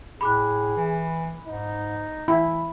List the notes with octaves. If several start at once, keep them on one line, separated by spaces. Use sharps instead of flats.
A2 G#4 B5 D6 F#6
E3
G#2 D#4
E3 E4 B5